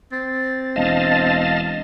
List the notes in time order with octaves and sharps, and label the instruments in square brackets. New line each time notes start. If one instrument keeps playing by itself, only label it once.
[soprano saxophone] C4 [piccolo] A6
[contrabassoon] E1 [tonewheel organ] D#5 F5 A5